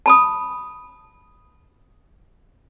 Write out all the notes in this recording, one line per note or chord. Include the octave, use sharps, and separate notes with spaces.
A5 B5 D#6